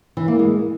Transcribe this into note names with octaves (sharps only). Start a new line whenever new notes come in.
E3
A#3
G#3